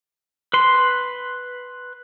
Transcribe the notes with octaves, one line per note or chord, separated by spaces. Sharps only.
B4 C6